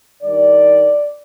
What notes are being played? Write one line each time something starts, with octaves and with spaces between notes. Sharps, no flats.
G2 D#3 D5